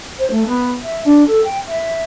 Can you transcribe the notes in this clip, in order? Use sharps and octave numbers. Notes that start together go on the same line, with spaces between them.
C5
A3
B3
E5
D4
A4
G5
E5